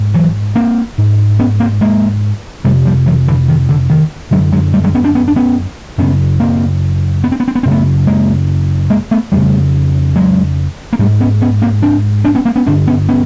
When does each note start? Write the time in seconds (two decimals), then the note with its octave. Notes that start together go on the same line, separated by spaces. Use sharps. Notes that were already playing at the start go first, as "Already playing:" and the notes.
Already playing: G#2
0.14 E3 F#3
0.55 A#3 C4
0.98 G#2
1.39 B3 C#4
1.60 A#3 C4
1.81 G#3 A#3
2.64 F2 C3 G3 A3
2.85 F3 G3
3.06 E3 F#3
3.27 D3 E3
3.48 D#3
3.69 D3
3.90 D#3
4.31 F#2 D3 F#3 G#3
4.53 F#3 G#3
4.73 G3 A3
4.84 F#3 G#3
4.94 B3 C#4
5.04 C4 D4
5.15 B3 C#4
5.28 D4
5.36 B3 C#4
5.98 F#2 C#3 B3 C#4
6.40 A#3 C4
7.24 B3
7.32 C4
7.40 B3
7.48 C4
7.55 B3
7.63 F#2 C#3 C4
7.71 A3 B3
8.07 G#3 A#3
8.90 G#3 A#3
9.11 A3 B3
9.32 F2 C#3 G3 A3
10.16 F#3 G#3
10.93 A#3
10.99 G#2 G3 A3
11.20 B3 C#4
11.41 B3 C#4
11.62 A#3 C4
11.82 C4 D4
12.24 C4 D4
12.35 B3 C#4
12.45 A#3 C4
12.56 B3 C#4
12.66 G2 D3 C4 D4
12.88 B3 C#4
13.09 B3 C#4